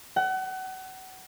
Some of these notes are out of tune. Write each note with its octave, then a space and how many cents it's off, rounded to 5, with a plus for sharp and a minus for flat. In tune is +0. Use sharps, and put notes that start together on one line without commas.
F#5 +30